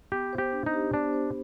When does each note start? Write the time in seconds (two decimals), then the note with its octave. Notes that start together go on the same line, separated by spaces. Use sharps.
0.12 B3 G4
0.33 C5
0.38 G4
0.53 D4
0.66 D#4
0.73 G4
0.93 B3 D4
1.13 C5